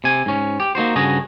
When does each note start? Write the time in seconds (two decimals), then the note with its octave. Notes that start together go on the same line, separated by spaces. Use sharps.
0.04 C3 G#5
0.26 G#2 C#4
0.60 G4
0.75 A#3 D#4 F#4 C5
0.95 G2 C#3 F#4 G#4 D#5